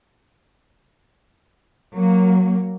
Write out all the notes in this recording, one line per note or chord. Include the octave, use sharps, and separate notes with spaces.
F#3 A#3